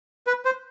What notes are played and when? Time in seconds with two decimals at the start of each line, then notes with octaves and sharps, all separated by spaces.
0.27 B4
0.45 C5